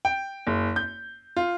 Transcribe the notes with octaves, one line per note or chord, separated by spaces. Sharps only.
G5
F#1
G6
F4